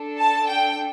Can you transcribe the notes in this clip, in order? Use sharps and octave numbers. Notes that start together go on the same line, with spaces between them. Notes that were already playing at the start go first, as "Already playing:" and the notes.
Already playing: D4 A4
A5
G5